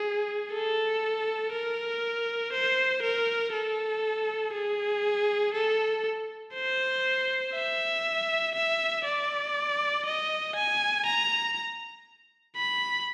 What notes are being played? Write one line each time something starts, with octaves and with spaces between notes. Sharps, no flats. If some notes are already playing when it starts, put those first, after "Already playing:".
Already playing: G#4
A4
A#4
C5
A#4
A4
G#4
A4
C5
E5
E5
D5
D#5
G#5
A#5
B5